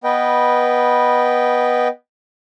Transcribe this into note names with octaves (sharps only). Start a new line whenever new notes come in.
B3 B4 D#5 G5